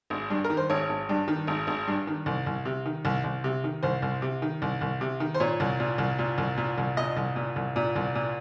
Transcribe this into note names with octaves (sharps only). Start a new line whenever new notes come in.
G#1
G2
A#4
D#3
C5
G#1 C#5
G#1
G2
D#3
G#1
G#1
G2
D#3
C2
C2
C3
D#3
C2
C2
C3
D#3
C2 C5
C2
C3
D#3
C2
C2
C3
D#3
C5
A#2 C#5
C2
A#2
C2
A#2
C2
A#2
C2
A#2 D#5
C2
A#2
C2
A#2
C2
A#2